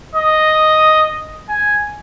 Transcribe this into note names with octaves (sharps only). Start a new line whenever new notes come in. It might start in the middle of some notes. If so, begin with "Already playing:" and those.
D#5
G#5